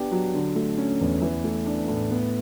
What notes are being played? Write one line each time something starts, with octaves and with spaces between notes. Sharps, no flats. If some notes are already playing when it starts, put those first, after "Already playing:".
Already playing: B3 D4 G4
F#3
D3
A3
C#4
E2
E3
A3
D4
A2
B3